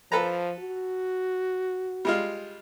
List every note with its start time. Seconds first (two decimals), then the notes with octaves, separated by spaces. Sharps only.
0.12 F3 A4 B4 A#5
0.60 F#4
2.05 G3 G#3 F4